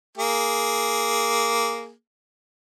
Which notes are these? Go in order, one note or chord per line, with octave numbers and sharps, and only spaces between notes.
A#3 G#4